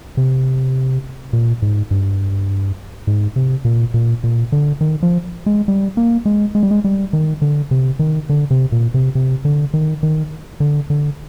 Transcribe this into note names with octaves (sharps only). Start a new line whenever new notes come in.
C3
A#2
G#2
G2
G#2
C3
A#2
A#2
A#2
D3
D#3
F3
G#3
G3
A#3
G#3
G#3
G3
G#3
G3
D#3
D3
C3
D#3
D3
C3
A#2
C3
C3
D3
D#3
D#3
D3
D3